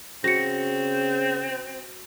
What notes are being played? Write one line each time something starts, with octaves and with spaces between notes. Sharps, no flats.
C#3 C4 F#4 A#6 C#7